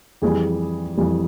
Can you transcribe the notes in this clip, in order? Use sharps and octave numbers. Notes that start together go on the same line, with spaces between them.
F2 E3 G3 G#4
F2 E3 G3